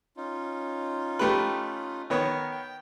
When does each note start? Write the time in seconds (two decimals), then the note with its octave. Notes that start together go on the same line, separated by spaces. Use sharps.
0.17 C#4 D#4 F4
1.19 A3 G4 B4
2.10 D#3 B3 A#4 C#5
2.51 G5